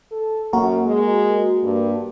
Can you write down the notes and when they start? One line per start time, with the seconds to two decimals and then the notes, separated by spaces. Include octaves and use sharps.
0.11 A4
0.53 F#2 A#3 F#4 A#4
0.86 G#3
1.64 G2